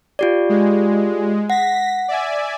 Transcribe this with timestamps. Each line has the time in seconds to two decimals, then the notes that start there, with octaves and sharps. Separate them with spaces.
0.19 F4 G4 D5
0.49 G#3
1.50 F#5 A#6 B6
2.08 D5 E5 G#5